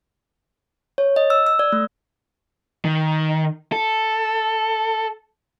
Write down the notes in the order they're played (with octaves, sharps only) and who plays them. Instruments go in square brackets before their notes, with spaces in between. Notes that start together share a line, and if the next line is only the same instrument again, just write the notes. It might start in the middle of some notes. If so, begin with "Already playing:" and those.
[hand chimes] C#5
D#5
E6
E6
D5
A3
[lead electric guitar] D#3
A4